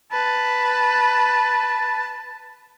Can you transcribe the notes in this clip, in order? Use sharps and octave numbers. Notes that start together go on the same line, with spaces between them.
B4 A5